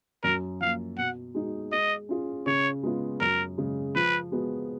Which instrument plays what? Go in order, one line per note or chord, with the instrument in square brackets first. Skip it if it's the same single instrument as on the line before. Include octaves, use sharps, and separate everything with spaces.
[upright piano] F#2 [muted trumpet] A#4
[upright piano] F3 A#3 [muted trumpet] F5
[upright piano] B2 [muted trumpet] F#5
[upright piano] G#3 D#4 F#4
[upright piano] G#3 [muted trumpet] D#5
[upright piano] C#4 F4 G#4
[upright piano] C#3 [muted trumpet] C#5
[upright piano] G#3 B3 F4
[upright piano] F#2 [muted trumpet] A#4
[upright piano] C#3 G#3
[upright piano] F3 [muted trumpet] B4
[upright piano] G#3 B3 F#4